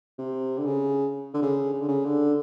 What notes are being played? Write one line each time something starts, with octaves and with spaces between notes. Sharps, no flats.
C3
D3
C#3
D3
C#3
C#3
D3
C#3
D3